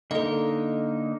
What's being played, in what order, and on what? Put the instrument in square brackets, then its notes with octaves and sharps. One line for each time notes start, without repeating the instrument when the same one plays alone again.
[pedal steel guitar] D3 A#3 D#4 [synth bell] A4 D#5